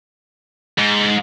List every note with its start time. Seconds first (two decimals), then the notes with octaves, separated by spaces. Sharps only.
0.79 G#2